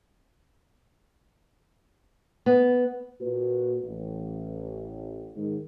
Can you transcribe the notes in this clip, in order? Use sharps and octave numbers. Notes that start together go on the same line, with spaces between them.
B3
A#2 F#4 B4
A1
G#2 D#3